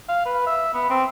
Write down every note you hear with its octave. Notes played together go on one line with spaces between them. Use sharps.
F5
B4
E5
B3
C4